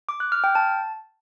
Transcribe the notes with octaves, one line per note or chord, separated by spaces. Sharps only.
D6
F#6
F6
G5
A5